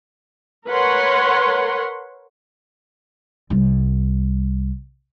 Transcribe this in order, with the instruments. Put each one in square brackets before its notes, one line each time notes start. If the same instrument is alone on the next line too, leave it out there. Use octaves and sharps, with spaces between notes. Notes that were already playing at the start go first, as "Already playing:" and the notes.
[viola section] A#4 B4 C#5 F#5 C6
[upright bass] C2 G3